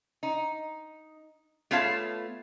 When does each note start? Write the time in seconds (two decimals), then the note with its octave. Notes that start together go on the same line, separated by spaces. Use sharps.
0.23 D#4
1.71 A3 B3 F4 C#5 F5 A5